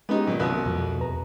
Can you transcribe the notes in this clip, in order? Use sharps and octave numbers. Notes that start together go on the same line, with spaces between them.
G#3 B3 C#4 D#4 G4
A#2 D#3 F#3
C2 B3 F#4
F2 B2 F3
E2 B4 A#5